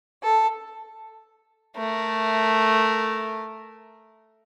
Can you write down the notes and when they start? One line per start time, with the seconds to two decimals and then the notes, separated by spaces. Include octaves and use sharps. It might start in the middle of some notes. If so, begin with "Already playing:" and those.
0.23 A4
1.76 A3 A#4